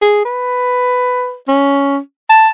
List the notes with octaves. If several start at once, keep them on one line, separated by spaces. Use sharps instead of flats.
G#4
B4
C#4
A5